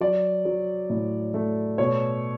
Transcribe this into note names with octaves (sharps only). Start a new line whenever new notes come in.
F#3 D5
F#3
A2
A3
B2 C#5